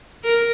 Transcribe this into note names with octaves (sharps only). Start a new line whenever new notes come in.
A#4